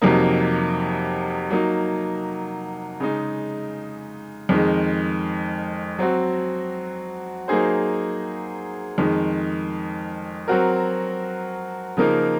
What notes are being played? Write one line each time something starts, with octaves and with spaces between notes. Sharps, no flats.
F2 C3 F#3 A#3 D#4
F#3 A#3 D#4
C#3 G#3 D#4
F2 D#3 G#3
F#3 C4 F#4
F#3 A#3 D#4 G#4 C5
F2 D#3 G#3
F#3 C4 F#4 A#4
C#3 F3 A#3 D#4 A#4